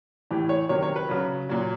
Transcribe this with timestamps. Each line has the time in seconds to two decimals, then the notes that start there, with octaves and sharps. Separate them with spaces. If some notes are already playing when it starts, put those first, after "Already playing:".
0.31 A2 E3 G4
0.49 C#5
0.69 C3 D#3 F#3 C#5
0.83 C#5
0.96 B4
1.09 C#3 F#3
1.49 A#2 F#3